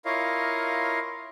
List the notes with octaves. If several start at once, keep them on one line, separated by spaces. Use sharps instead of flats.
E4 F4 A#4 C#5 D#5 F5